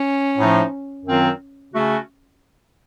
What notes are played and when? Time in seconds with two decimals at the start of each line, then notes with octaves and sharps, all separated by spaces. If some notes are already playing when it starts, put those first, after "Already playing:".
Already playing: C#4
0.38 A2 F3 A3 D#4
1.06 F#2 D#3 F#3 C4 F4
1.74 C#3 A3 C#4 F#4